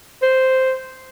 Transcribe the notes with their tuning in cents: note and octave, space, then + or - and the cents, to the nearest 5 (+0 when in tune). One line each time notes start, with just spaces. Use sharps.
C5 -5